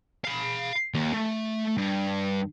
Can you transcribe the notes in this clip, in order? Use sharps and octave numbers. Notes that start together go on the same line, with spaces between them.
F5 B5
D#2
A3
G2